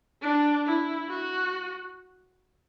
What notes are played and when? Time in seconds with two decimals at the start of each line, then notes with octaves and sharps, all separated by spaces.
0.22 D4
0.66 E4
1.09 F#4